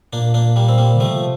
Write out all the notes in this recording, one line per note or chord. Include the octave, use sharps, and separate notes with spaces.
A#2 A#3 D4
A#3 D4
G3 A#3
C4
G3 A#3
D3
C3 F3 A3